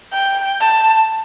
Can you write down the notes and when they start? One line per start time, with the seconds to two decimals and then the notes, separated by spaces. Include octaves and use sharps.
0.13 G5
0.61 A5